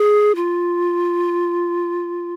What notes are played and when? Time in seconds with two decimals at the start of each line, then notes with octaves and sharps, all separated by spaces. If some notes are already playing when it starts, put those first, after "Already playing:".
Already playing: G#4
0.35 F4